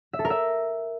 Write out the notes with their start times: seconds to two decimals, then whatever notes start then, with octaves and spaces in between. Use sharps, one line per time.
0.13 E5
0.19 A4
0.25 A#4
0.30 E5